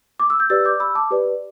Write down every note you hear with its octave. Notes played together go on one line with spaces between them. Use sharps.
D6
E6
G6
G4 B4 D5 E6 A6
D6 G6
B5 E6
A5 D6
G4 B4 D5